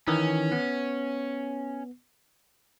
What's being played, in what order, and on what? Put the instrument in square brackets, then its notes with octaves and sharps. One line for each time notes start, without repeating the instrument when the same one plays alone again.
[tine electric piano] D#3 E3 [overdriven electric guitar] C#4
[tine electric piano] B3